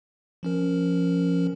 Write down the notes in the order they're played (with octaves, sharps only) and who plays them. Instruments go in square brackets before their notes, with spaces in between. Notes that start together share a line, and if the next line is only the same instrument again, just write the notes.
[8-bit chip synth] F3 C#4 A#4